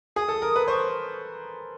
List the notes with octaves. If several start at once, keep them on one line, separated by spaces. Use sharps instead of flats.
G#4 D#6
A4
A#4
B4
C5 C#6